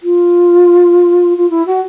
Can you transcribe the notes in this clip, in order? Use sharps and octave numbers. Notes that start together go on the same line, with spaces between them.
F4
F4
E4
F#4